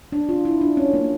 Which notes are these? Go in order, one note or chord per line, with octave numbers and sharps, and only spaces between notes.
D4
F4
E4
D4
C#4
A#3